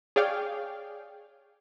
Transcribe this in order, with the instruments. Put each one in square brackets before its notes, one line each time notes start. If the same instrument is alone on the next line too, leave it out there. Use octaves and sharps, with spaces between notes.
[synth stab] G#4 C#5 D5 F5 G5